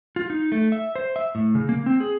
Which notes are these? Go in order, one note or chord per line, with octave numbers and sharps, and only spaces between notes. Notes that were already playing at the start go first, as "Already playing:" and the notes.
F4
D#4
A3
E5
C5
E5
A2
C#3
A#3
C4
G#4